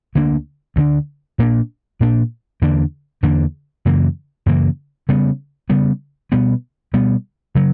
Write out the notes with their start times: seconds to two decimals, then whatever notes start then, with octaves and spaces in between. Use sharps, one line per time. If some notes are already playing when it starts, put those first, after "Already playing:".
0.15 D2 D3 A#3 D4
0.76 D2 D3 A#3 D4
1.39 A#2 A#3 D4
2.00 A#2 A#3 D4
2.62 E2 D3 A#3 D4
3.23 E2 D3 A#3 D4
3.85 F#2 C#3 E3 A#3
4.46 F#2 C#3 E3 A#3
5.09 C#3 G3 B3
5.70 C#3 G3 B3
6.32 B2 G3 B3
6.93 B2 G3 B3
7.55 C#3 F#3